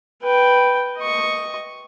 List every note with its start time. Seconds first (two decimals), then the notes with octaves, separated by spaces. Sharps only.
0.23 B4 G5
0.98 D#5 C#6